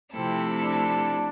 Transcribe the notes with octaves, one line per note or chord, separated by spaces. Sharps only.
C3 F3 A3 C4 E4 A4
D4